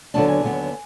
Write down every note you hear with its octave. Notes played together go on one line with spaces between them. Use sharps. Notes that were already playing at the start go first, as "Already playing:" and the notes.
D#2 D3 F#3 B3 D4 A5
G#5
D#2 D3 F#3 B3 D4